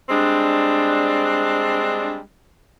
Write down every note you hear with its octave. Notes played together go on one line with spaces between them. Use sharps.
G3 G#3 C4 D4